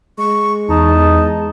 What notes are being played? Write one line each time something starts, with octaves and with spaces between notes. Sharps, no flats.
G#3 C#6
E2 D#4 A5